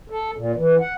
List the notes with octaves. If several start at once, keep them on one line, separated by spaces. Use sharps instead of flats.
A4
A#2
E3
F#5